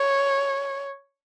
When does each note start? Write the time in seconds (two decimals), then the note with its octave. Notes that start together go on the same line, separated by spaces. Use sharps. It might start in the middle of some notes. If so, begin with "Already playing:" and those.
Already playing: C#5